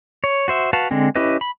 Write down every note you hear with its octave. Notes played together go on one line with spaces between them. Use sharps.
C#5
F#4 C5 E5
F#4 B4 F5 A5
D3 G#3 C4
C#4 E4 G4 B4 D#5
B5